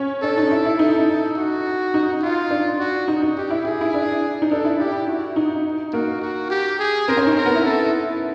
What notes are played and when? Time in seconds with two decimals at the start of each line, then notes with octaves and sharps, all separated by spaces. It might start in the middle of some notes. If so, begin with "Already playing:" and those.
Already playing: C#4
0.22 D4 A4
0.37 D#4
0.51 E4
0.65 E4
0.79 D#4 A4
1.37 F#4
1.94 D#4
2.22 F4
2.50 D4
2.79 F#4
3.08 D#4
3.22 D#4
3.37 G4
3.50 E4
3.65 E4 G#4
3.81 E4
3.94 D4
4.42 D#4
4.51 D4 A4
4.65 E4
4.80 E4 G4
5.07 F#4
5.36 D#4
5.93 A#3 F#4
6.21 F#4
6.50 G4
6.79 G#4
7.08 C4 A#4
7.17 C#4
7.27 D#4
7.36 A#4
7.46 B3
7.55 E4
7.65 A4